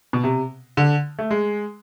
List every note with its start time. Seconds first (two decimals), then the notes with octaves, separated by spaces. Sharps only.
0.13 B2
0.24 C3
0.77 D3
1.19 A3
1.31 G#3